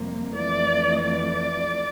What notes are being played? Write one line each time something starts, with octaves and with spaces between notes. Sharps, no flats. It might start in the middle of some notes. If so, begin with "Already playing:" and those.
Already playing: F2 C3 G3 A#3
F2 E3 A3 D5
D5